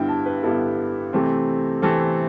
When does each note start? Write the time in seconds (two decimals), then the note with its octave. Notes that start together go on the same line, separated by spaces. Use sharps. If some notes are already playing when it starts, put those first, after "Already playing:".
Already playing: G2 D3 G3 B3 E4 G5
0.08 A5
0.26 B4
0.43 G2 D3 G3 B3 E4 A4
1.13 C3 E3 A3 C4
1.82 C3 E3 A3 C4 A4